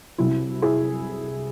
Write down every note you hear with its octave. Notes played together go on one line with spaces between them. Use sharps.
C2 C3 F#3 E4
E4 G#4